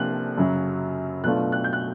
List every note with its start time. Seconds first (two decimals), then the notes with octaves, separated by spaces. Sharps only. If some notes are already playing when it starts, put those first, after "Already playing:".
Already playing: C3 F3 A#3 D4 F#6
0.38 F#2 C#3 F#3
1.24 B2 F#3 A3 D4 F4 F#6
1.52 F#6
1.64 G6
1.73 F#6